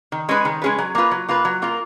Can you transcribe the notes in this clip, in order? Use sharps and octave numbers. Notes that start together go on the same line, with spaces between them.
D#3
G#3 C#4 G#4 B4
D#3
G#3 C#4 G#4 B4
F#3
A#3 F4 B4
F#3
A#3 F4 B4
F#3
A#3 F4 A#4